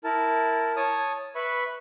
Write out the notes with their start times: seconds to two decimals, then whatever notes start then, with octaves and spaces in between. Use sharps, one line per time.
0.04 E4 A#4 A5
0.77 C#5 A5 D#6
1.35 B4 E5 B5 C#6